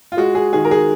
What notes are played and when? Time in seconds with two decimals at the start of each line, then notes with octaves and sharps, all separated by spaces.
0.12 F4
0.17 G#3 F#4
0.35 G#4
0.53 D#3 G#4
0.65 A#4
0.71 G#4